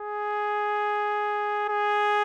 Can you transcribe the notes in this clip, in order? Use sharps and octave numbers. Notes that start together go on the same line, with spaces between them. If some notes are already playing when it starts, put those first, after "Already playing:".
Already playing: G#4
G#4